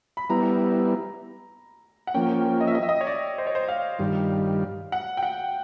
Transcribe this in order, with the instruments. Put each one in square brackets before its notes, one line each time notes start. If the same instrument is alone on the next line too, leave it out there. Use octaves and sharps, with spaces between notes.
[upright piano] B5
[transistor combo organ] G3 B3 E4 [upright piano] A#5
[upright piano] F#5
[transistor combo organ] F3 A#3 C#4 [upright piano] G5
[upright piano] D#5
E5
D#5
E5
D#5
C#5
D5
C5
C#5
C5
F5
[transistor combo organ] G2 D#3 G3
[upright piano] F#5
G5
F#5